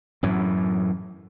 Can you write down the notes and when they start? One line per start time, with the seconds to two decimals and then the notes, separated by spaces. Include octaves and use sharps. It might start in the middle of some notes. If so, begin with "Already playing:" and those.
0.23 F#2 A2 E3